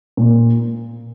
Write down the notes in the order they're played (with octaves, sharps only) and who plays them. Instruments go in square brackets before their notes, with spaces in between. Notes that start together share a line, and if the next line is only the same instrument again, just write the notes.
[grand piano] A#2